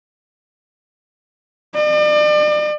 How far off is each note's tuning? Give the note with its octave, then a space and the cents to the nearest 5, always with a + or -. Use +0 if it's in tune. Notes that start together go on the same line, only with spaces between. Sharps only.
D5 +40